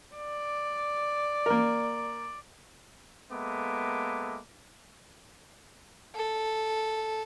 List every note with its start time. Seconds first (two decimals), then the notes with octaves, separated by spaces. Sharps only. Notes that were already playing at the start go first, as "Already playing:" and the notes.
0.17 D5
1.46 A#3 A#4
3.31 G#3 A#3 B3 A4 E5 D6
6.15 A4